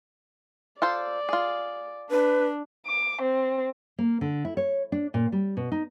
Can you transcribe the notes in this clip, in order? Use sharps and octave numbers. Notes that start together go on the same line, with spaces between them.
F4 A4 C5 D5
F4 G#4
D4 B4
D6
C4
A#3
D3
E4
C#5
D4
A#2
G3
B2
D#4